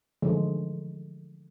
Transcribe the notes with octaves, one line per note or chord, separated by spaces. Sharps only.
D3 E3 F3 G#3 A3